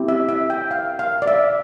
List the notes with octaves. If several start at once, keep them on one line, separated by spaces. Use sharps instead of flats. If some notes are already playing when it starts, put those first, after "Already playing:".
Already playing: C4 E4 G4
E5
E5
G5
F5
F5
D5
E5